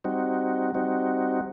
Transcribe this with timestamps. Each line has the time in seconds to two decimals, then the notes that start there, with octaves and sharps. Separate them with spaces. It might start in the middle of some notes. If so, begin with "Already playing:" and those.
0.04 G3 C4 D#4 F#4
0.75 G3 C4 D#4 F#4